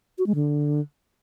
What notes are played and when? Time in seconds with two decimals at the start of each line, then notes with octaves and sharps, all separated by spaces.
0.18 F#4
0.27 G#3
0.35 D3